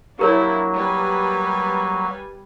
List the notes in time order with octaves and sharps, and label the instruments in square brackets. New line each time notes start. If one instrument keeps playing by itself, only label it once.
[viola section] F3 D4 E4 [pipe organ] F#3 A#3 [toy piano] G4 A#4 C#5
[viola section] G3 B4 G#5